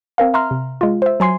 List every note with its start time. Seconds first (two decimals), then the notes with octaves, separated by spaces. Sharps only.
0.18 C4 A#4 F5
0.34 E5 A#5 C6 F6
0.51 C3
0.81 G#3 F4
1.02 C5 E5
1.20 F#3 G#5 C6 C7